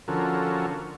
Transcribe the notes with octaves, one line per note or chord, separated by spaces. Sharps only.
D3 F3 C#4 F#4 A4 A#4